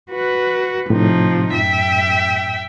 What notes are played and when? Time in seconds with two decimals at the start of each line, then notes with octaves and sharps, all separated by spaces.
0.11 F#4 B4
0.90 A2 C3 F3 D#4
1.55 F#2 E5 G5